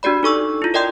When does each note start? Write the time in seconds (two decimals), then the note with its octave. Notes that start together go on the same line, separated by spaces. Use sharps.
0.03 D4 F#4 G4 D5 B5
0.23 D#4 A4 C#6 E6
0.62 E4 F4
0.74 A#4 D5 D#5 G5 C6 G6